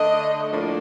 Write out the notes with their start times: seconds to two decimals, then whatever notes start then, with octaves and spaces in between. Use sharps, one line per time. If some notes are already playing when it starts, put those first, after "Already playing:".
Already playing: D3 A3 D4 D#5
0.52 A2 F3 A#3 D4